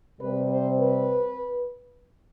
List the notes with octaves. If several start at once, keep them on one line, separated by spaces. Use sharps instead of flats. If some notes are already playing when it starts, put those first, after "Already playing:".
C3 G3 C4 B4
C5
B4